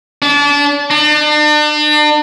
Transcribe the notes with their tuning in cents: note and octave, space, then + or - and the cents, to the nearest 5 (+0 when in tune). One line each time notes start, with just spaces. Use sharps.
D4 -30
D4 +40